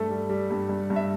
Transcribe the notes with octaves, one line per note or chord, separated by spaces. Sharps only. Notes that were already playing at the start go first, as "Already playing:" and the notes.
Already playing: G2 A3 A4
G3
G3
G2
G2
G2
E5